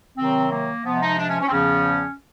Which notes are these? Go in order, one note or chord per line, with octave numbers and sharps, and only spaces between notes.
C3 D#3 F#3 C4
A#3
C3 F3 G#3 B3
D#4
D4
C#4
C#4
C4
E2 C#3 F3 C#4